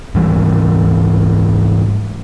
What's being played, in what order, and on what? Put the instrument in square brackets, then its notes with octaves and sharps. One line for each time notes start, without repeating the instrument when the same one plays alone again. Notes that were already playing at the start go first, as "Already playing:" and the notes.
[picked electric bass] G#2 E3 G3